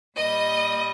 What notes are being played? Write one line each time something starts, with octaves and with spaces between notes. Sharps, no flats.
A#2 G3 D#5